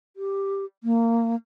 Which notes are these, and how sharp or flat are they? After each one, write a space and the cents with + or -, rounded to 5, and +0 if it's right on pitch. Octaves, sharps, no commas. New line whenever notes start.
G4 +5
A#3 -20